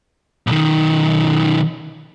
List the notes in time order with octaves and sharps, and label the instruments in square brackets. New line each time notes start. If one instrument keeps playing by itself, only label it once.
[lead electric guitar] B1 D#3